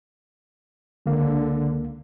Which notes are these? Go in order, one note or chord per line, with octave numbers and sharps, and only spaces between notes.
C#2 D3 A#3